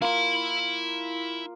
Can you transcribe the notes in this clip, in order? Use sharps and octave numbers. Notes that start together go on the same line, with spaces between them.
A#3 E4 F4 B5